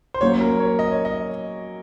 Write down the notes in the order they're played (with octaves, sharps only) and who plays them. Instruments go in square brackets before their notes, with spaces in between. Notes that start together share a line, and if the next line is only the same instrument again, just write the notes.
[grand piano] C5
[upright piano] F#3 A#3 C#4 F#4 [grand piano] C#5
[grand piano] A#4
C#5
D#5
C#5
D#5